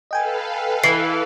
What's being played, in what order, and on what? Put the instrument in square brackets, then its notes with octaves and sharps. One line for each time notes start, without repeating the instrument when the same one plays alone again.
[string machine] A4 B4 F5 [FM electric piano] D#5 G5 G#5
[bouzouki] E3 [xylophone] C7